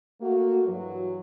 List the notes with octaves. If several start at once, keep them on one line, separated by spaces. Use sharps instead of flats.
A3 A#3 F#4
G2 E3 F#3